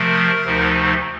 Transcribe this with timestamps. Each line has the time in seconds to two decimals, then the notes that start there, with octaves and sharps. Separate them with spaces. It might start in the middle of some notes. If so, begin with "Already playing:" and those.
Already playing: C3 F3 A3 A#4
0.44 D2 C3 F3 A3 D#4